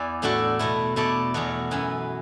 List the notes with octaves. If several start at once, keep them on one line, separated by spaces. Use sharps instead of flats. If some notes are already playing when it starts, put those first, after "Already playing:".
Already playing: E2 E3 E4 D5
A2 A3 D4 F#4 A4
B2 A3 E4
B2 A3 E4 A4 D5
E2 B2 A3 F#4
F#2 E3 B3